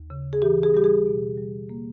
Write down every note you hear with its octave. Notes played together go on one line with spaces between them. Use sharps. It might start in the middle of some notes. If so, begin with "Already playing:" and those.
Already playing: D#2
C#3
G#4
E3 G4
G#4
G3 G4
G#4
B2
G3
A#3